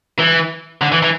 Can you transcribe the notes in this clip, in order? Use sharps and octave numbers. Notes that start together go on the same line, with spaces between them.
E3
D3
E3
E3